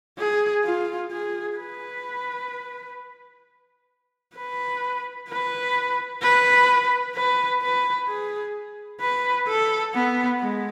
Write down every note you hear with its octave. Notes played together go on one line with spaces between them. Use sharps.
G#4
F4
G#4
B4
B4
B4
B4
B4
B4
G#4
B4
A4
B3
G#3